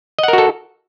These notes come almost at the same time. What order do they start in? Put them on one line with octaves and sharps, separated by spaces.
D#5 F#5 A#4 F#4 A4